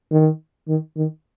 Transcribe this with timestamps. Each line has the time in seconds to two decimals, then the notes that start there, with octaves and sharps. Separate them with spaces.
0.11 D#3
0.68 D#3
0.97 D#3